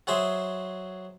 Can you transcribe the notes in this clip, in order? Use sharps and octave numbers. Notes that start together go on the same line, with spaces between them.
F#3 G#4 C5 E5